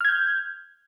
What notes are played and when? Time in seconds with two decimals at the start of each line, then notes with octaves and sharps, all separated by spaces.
0.01 F6
0.05 G#6
0.09 G6